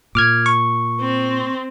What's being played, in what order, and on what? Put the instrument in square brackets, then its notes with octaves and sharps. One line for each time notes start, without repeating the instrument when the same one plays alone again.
[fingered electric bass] A#2 [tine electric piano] D6 F6 G#6
[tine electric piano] C#6
[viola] C4